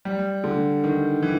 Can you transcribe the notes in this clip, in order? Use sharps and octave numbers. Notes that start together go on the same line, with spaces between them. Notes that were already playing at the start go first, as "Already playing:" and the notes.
G3
D3
D#3
E3